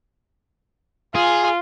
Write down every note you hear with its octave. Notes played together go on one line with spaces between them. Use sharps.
F4 G#4